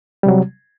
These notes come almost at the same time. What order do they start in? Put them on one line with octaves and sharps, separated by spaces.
G3 C3 F#3